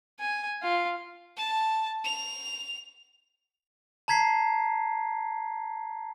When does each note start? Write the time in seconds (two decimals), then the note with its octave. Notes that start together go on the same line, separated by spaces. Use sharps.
0.20 G#5
0.63 F4
1.36 A5
2.04 F7
4.08 A5 A#5 G#6 B6 C7